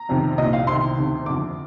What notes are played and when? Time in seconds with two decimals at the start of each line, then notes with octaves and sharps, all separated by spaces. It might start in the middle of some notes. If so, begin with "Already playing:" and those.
Already playing: A#5
0.09 F2 C3 D#3
0.38 C2 A#2 D#5
0.53 F5
0.67 C2 C3 D#3 C6
0.98 D2 C3 D#3
1.26 F2 D3 D6